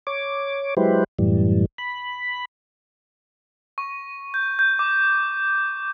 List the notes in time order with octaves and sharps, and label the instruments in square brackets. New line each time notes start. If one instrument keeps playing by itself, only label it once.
[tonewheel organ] C#5 D6
F#3 G#3 E4 G4 B4 C5
F#2 A2 E3 G3
B5
[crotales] C#6
G6
G6
D6